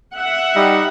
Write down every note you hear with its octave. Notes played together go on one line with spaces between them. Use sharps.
E5 F#5
G3 D#4